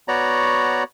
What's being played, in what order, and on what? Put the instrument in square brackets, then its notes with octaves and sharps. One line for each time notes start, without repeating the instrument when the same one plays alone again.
[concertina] B3 F#4 C#5 D5 A#5